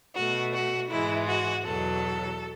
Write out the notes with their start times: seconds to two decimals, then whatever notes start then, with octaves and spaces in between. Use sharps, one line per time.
0.15 B2 A3 F#4
0.53 F#4
0.90 G#2 E3 G#3 E4
1.27 F#4
1.65 E2 B2 F#3 A4